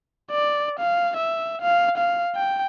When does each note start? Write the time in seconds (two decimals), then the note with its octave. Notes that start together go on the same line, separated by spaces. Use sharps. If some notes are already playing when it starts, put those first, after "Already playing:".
0.31 D5
0.80 F5
1.17 E5
1.62 F5
1.98 F5
2.36 G5